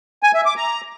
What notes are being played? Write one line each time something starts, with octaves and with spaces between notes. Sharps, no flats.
G#5
E5
D6
A#5